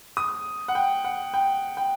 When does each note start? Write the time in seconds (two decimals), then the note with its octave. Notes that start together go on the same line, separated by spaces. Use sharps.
0.17 D#6
0.68 F#5
0.75 G5
1.04 F#5
1.34 G5
1.77 G5